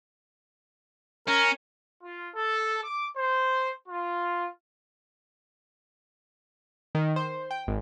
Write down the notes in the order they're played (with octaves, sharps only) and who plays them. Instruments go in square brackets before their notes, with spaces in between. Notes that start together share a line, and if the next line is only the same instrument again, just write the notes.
[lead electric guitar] C#4 [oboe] A#4
[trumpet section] F4
A4
D6
C5
F4
[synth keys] D#3
C5
G5
G#1